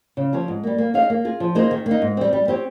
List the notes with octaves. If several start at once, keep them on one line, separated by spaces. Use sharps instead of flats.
C#3
F3 C4 G4 C#5
G#2
G3 A#3
A#3
D#4 G#4 C#5 F5
A#3
F4 G#4
F3
A#3 D#4 G#4 C5
D#3
A#3
D#4
G#2
G3 C4
G3
C4 G4 C#5